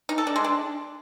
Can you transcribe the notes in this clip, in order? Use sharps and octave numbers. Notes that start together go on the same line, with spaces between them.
D#4
A4
D4
G#3
D4